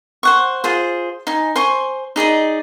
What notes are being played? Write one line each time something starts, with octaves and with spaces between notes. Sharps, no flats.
C5 F#5 C#6
F4 G#4 C5
D#4 G#5
C5 G#5 C6 C#6
D#4 G#4 D5 D#5